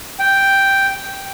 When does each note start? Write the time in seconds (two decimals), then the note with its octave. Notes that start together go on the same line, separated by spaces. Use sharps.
0.19 G5